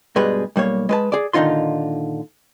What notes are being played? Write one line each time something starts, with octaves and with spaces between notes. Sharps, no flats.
G2 B2 G3 G#3 G#4 B4
B1 G3 A#3 C#5
G#3 B4 A5
G#4 D5
A#2 D3 D#3 D#4 F4 C6